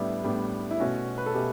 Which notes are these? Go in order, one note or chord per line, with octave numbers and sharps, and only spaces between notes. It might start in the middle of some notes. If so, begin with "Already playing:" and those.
Already playing: A2 G3 B3 D4 E4
A2 G3 B3 D4
E4
B2 A3 C#4 F#4
B4
A4
B2 A3 C#4 G4